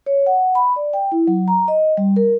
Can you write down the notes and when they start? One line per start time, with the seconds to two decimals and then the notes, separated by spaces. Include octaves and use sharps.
0.06 C#5
0.26 F#5
0.55 B5
0.76 D5
0.93 G5
1.12 E4
1.27 F#3
1.48 A#5
1.68 D#5
1.97 G3
2.16 A#4